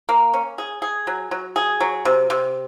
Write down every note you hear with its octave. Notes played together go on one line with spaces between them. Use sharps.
A#3
C#4
G#4
G#4
F#3
F#3
G#4
F#3
C3
C3